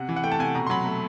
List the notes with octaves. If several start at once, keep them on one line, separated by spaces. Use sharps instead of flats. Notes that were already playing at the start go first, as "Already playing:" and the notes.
Already playing: C3 F#5
E3
F#5
A3 G5
A5
C3 G#5
B2 A#5
C6
F#3 B5
A3